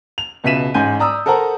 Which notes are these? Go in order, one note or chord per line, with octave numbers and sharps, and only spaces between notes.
F7
C#2 B2 E5 B6 D#7 E7
A1 G#2 G#5 G6 D#7
D5 A#5 D#6 E6
A4 A#4 C5 F#5 A#5